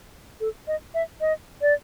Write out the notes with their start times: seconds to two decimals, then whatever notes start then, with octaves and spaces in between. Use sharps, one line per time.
0.40 A4
0.68 D#5
0.94 E5
1.21 D#5
1.62 D5